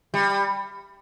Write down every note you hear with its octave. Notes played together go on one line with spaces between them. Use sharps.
G3